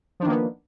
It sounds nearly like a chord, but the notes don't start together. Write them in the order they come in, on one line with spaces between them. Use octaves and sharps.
F3 D4 D#3 A#3 B3